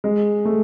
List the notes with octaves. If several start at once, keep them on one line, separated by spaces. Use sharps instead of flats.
G#3
A3